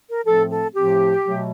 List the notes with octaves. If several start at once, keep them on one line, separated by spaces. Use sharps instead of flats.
A#4
A2 F3 A3 C4 A4
A4
A2 F3 A3 C4 G4
B2 F#3 A3